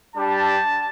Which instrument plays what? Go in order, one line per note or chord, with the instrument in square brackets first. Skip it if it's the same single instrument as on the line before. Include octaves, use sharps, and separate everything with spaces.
[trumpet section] G3 D4 G4 A5